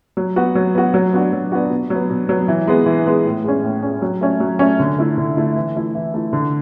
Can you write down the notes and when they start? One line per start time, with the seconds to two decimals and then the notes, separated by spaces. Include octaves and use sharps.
0.17 F#3
0.36 B3 F#4
0.55 F#3
0.75 B3 F#4
0.94 F#3
1.13 B3 D4 F#4
1.33 F#3
1.52 B3 D4 F#4
1.70 B2
1.90 F#3 B3
2.10 B2
2.29 F#3 B3
2.48 E3
2.67 G#3 B3
2.86 E3
3.06 G#3 B3
3.25 A2
3.44 G#3 C#4
3.63 A2
3.83 G#3 C#4
4.02 F#3
4.21 A3 C#4
4.40 F#3
4.59 A3 C#4
4.80 D3
4.98 A3 E4
5.18 D3
5.37 A3 E4
5.56 E3
5.75 A3 E4
5.95 E3
6.14 A3 E4
6.33 D3